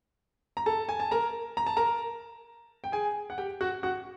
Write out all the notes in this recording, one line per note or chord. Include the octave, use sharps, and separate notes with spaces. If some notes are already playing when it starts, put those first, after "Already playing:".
A#5
A4 A5
G#5
A5
A#4 A#5
A#5
A5
A#4 A#5
G5
G#4 G#5
F#5
G4 G5
F#4 F#5
F#4 F#5